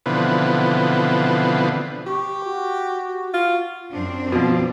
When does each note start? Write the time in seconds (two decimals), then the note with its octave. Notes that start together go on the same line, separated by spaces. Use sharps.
0.06 B2 D3 E3 F3 B3 C4
2.07 G4 C#6
2.43 F#4
3.34 F4
3.92 F#2 C4 D4
4.32 B2 F3